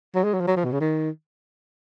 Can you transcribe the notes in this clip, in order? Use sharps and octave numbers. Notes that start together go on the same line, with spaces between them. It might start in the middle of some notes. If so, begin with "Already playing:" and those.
F#3
G#3
F#3
F3
F#3
F3
B2
C#3
D#3